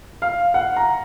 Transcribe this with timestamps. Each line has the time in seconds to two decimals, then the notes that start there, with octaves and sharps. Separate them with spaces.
0.22 F5
0.54 F#5
0.77 A#5